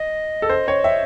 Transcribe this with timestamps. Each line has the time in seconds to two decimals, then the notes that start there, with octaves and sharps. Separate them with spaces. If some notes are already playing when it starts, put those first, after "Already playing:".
Already playing: D#5
0.42 A4
0.49 C5
0.68 C#5
0.84 E5